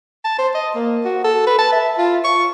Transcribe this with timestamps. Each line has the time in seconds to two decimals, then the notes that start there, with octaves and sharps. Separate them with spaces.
0.25 A5
0.39 C5
0.55 D#5
0.75 A#3
1.05 F#4
1.24 A4
1.47 B4
1.59 A5
1.72 E5
1.98 F4
2.24 C#6